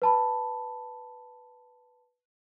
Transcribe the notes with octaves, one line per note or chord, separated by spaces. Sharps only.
B4 A5 B5